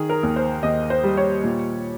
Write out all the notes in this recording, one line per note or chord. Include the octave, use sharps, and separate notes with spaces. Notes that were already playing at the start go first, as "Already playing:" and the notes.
Already playing: D#3 G#4
A#4
D#2
C5
D#2 D#5
C5
G3
C#5
A#2